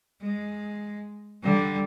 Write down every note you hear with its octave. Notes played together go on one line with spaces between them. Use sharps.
G#3
D3 G3